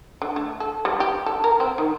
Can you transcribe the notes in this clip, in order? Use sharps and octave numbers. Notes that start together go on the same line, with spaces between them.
D3
A3
A4
G3
G4
A4
A#4
C4
D#3